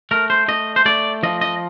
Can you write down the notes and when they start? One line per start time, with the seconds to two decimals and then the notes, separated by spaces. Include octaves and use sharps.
0.11 A3 A#4
0.30 C5
0.48 A3 D#5
0.76 C5
0.86 A3 D5
1.23 F3 D#5
1.41 D#5